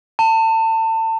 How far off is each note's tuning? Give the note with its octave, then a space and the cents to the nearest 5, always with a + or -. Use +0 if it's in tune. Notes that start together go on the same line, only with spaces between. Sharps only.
A5 +30